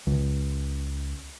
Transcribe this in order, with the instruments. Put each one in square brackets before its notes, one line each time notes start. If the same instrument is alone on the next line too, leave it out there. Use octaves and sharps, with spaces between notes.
[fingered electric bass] C#2